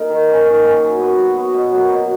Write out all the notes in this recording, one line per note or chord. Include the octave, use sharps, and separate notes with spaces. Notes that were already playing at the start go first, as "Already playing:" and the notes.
Already playing: A#3 D#4 F4 A#4
D#3
A#3 C#4
D#3
A#3 C#4
F#3
B3 F#4 B4
F#3
B3 F#4 B4
B2
F#3 A#3
B2